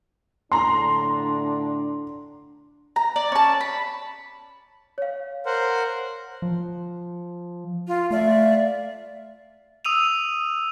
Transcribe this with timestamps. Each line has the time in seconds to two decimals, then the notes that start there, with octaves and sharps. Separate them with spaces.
0.52 A2 D3 D4 A#5 C6
2.96 A#5
3.16 D5
3.32 C#4 A5
3.61 B5
4.98 C#5 F5
5.46 A#4 C5 F#5
6.42 F3
7.87 F4
8.11 A3 D5 E5 F5
9.85 D#6 E6 D#7 F7